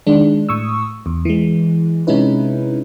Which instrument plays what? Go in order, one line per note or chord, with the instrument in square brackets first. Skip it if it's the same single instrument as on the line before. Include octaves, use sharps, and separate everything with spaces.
[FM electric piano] D#3 G#3 D4
A2 C#6 D#6 E6
E2
E3 G#3
C3 G#3 C#4 D#4 E4 B4